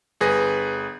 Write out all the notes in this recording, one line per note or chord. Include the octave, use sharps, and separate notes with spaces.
G1 G#4 B4 A#6